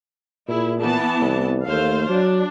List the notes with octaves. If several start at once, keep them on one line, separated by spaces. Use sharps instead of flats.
A#2 E4 G#4
E3 B3 A5
C2
D#2 A3 C5 F5
F#3 D4